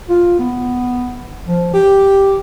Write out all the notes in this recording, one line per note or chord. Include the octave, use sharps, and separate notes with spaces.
F4
B3
F3
G4